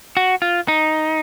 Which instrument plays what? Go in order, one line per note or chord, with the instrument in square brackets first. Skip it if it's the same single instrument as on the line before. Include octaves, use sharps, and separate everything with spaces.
[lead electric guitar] F#4
F4
D#4